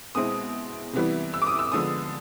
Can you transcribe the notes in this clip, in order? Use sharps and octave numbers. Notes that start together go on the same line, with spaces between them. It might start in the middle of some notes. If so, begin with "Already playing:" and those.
B2 G#3 C4 E4 D#6
C3 E3 G3 B3 E4
E6
D6
D#6
E6
D3 F3 G#3 B3 D#6